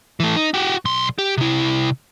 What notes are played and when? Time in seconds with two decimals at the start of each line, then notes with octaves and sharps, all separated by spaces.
0.20 E3 A3
0.36 D#4
0.54 F#4 G4
0.85 B1 C6
1.19 G4
1.37 C3 E4